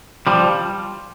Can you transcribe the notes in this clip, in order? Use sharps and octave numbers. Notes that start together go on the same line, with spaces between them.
F3 G3